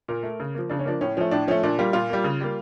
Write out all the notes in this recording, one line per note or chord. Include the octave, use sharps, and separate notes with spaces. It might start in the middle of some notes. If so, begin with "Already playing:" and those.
A#2 A#4
A3
C#3
F3 A#3
C#3 D4
C#4
F3 A#3 D4
A2 C#4
F3 A3 C#4
A2 D4
F3 A3 C#4
A#2 D4
G3 A#3 F4
A#2 F4
G3 A#3
C#3
G3 A#3